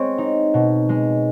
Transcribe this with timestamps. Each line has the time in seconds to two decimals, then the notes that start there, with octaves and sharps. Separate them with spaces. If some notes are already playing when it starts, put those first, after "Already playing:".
Already playing: G#3 C4 C#5
0.18 D#4
0.54 B2
0.89 G#3